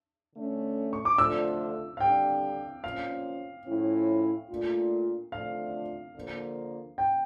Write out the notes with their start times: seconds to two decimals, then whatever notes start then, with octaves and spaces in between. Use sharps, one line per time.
0.35 D3 A3 C#4
0.93 C#6
1.05 D6
1.18 D3 F3 A3 D4 F4 E6
1.97 F5
2.00 D3 G3 D4 G5
2.84 A#2 F3 C#4 F5
3.67 A2 F3 C#4 E4
4.50 A#2 A3 D4 F4
5.32 D3 F3 A3 D4 F4 F5
6.15 D3 F3 A#3
6.98 G5